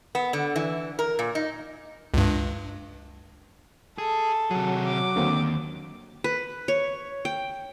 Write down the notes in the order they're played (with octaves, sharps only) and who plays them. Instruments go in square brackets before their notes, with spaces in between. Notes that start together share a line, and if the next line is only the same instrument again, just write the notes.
[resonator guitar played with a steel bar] B3
D3
E3
A#4
A#2
D#4
[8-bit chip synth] C#2 G2
[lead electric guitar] G#4 [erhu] A4
[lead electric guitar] C3 G#4 [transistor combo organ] F#3
[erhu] D6
[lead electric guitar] D#2 [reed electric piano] D3 A#3 C4
[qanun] B4
C#5
G5